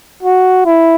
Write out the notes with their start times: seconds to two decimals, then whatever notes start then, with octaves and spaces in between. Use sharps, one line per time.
0.23 F#4
0.66 E4